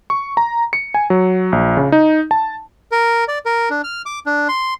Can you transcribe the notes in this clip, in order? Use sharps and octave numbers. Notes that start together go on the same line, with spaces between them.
C#6
A#5
C#7
G#5
F#3
A#1
C#3
D#4
A5
A#4
D5
A#4
D4
F6
D6
D4
C6